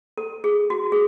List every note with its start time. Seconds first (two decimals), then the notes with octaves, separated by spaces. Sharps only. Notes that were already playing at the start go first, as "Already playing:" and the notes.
0.18 A4
0.44 G#4
0.70 F#4
0.92 G#4